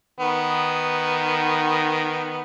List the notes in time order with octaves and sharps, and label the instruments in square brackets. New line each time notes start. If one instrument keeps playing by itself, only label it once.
[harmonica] D#3 B3